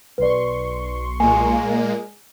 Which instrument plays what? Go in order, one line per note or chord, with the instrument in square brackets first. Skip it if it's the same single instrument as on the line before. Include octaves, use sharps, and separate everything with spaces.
[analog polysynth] B1 C6 C#6 [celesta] B4 D5
[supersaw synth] A#2 G#3 A#3 [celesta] G#5